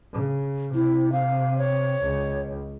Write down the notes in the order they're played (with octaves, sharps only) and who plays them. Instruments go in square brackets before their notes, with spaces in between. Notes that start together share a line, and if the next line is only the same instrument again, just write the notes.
[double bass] C#3
[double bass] C3 [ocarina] E4
[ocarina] F5
C#5
[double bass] C#2